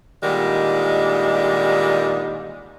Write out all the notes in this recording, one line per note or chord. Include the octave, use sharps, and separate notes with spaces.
A#2 D3 D#3 G3 G#3